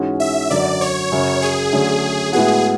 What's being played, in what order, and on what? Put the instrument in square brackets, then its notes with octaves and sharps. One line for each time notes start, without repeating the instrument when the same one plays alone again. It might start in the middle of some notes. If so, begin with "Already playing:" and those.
Already playing: [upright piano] G#2 E3 G#3 C#4 F#4
[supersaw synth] E5
[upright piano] F#2 D3 F#3 [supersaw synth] D5
[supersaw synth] C#5
[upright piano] F#2 C#3 F#3
[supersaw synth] G#4
[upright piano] D3 F#3 A3 C#4
[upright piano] A2 G#3 B3 F#4 [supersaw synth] G#4